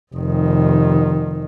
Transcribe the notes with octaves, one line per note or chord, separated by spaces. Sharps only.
F1 D#3